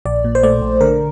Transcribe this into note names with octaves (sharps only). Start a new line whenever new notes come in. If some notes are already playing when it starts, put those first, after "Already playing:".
A#1 D5
A#2
C5
A3 D5
A#1
D3 A#4